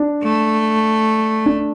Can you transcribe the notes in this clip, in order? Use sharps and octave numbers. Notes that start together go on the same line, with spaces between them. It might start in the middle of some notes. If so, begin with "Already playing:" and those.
Already playing: D4
A3
D4